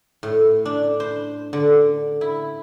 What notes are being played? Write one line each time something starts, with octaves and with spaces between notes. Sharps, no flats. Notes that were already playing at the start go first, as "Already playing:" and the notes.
A2
D4
C5
D3
E4